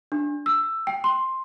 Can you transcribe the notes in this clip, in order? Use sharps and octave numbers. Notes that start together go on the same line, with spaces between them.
D4
E6
G5
C6